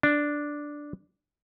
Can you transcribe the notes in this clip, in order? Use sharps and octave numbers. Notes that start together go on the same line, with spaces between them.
D4